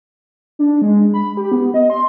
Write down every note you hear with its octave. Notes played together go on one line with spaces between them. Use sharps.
D4
G#3
B5
G4
B3
D#5
C6